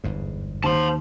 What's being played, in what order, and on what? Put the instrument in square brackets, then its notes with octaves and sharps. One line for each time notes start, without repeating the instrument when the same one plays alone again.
[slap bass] G1 E2 G#2
[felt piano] D#2 [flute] C5 [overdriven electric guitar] A5 C6